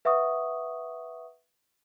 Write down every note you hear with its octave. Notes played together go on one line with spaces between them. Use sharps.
B4 E5 F#5 C#6 D#6